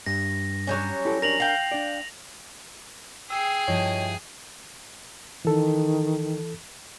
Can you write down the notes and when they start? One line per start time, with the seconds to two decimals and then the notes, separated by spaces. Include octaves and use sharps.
0.06 G2 A#6
0.67 F#3 G3 C#4
1.05 E4 G4 A4
1.22 D4 A#4 A#6 F7 F#7
1.40 F5 G5
1.72 D4 D5
3.30 G#4 G5 D#6 E6 G#6 C7
3.68 G2 F3 E4 C#5 D#5
5.45 D#3 E3 A4